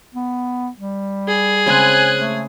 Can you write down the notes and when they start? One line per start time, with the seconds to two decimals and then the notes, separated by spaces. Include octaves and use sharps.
0.15 B3
0.76 G3
1.28 G#4
1.66 C#3 G#3 C4 G#5 F#6
2.15 A3